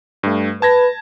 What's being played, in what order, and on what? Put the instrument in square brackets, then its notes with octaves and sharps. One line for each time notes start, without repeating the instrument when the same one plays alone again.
[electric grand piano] G2 A3
[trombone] B4 [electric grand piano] A5 G#6 A#6